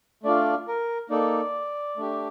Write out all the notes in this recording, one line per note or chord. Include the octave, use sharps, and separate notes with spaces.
A3 D4 F4 D5
A#4
A#3 D#4 A4 D5
A3 D4 G4